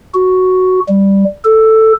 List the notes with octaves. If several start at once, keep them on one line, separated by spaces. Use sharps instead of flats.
F#4
G3
A4